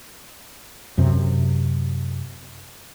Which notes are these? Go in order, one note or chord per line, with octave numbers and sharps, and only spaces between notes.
F#2 C3